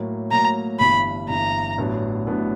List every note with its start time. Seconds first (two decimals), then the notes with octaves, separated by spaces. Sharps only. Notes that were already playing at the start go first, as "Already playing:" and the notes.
Already playing: A2 F#3 A#3
0.31 A2 F#3 A#3 A#5
0.79 G1 G2 E3 B5
1.29 G1 G2 E3 A#5
1.78 A1 A2 F#3 B3 D4
2.26 A1 A2 F#3 B3 D4